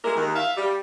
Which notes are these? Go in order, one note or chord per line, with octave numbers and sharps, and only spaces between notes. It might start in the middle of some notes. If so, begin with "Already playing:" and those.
G#3 A#3 E4 A#4
D#2 D#3
E5 F5
G3